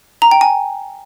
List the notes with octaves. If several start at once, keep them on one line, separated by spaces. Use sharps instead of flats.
A#5
G5
G#5